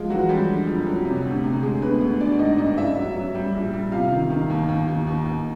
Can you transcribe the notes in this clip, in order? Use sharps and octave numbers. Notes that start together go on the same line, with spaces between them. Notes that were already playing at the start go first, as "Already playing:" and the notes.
Already playing: F3 G#3 F4
E3 F#3 F#4
G3 G#3 G4
D3
F2
F#3
C3
D2
C3
D3 G#3 G#4
D2 B3 B4
D2
D3 D4 D5
G#1 D#4 D#5
G2 D#4 D#5
C#3 E4 E5
F#3
F#3
G3
A#1
G3
C3 F4 F5
D#3
D#3
D#2
D#2
D#2
D#2
D#2